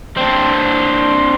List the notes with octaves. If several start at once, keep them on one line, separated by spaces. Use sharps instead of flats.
C4 D4